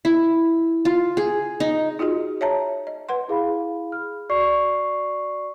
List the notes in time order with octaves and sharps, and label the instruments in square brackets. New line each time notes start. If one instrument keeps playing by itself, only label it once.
[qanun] E4
F4
G#4
D#4
[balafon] D#4 F4 F#4 G#4 D#5
C#5 E5 A5 A#5
D#5
B4 F#5 C6
[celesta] E4 G#4 F5 B5
F6
F#4 D5 C#6 C7